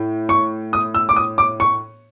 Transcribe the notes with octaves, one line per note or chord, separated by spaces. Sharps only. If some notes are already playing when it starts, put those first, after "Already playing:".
Already playing: A2
C#6
D#6
E6
D6
D#6
D6
C#6